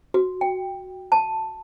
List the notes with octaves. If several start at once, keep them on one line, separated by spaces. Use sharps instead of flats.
F#4
G5
A5